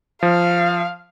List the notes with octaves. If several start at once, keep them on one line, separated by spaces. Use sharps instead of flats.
F3 F5